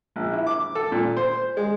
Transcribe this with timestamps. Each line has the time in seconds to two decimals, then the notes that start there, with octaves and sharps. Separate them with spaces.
0.16 A#1
0.33 E4
0.47 D6
0.75 A4
0.92 A#2
1.17 C5
1.57 G#3